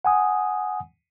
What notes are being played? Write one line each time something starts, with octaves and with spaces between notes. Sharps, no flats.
F#5 G#5 D#6